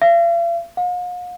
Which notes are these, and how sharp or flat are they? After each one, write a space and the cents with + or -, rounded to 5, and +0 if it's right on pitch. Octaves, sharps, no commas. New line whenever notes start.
F5 -45
F5 +45